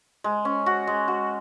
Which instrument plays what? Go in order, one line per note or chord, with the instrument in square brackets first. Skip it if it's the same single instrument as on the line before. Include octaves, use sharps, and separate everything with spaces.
[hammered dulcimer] G#3
C#4
F#4
G#3
F#4